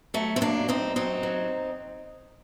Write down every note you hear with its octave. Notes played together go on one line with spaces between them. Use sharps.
F#3 A3
C4
F#2 A#3 D4
F#2 C4 D#4
F#3 C4 D#4
F#3